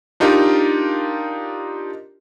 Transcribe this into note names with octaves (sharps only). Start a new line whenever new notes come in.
D4 D#4 F4 G4 A#4